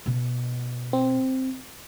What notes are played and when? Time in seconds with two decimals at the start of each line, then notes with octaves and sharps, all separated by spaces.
0.06 B2
0.93 C4